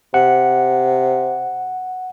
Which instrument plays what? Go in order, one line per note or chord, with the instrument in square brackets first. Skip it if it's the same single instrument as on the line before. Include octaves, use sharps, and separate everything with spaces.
[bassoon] C3 [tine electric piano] F#5